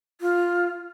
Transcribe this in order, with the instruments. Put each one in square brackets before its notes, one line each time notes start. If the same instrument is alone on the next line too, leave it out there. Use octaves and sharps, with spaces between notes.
[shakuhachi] F4